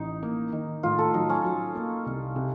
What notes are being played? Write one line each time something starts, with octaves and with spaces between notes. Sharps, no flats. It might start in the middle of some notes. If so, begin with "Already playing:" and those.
Already playing: A1 D#4
A#3
D#3
A2 F4
A4
F#3 D#4
C#4
F#3
A#3
C2
C3